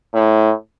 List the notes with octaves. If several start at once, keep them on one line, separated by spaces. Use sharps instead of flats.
A2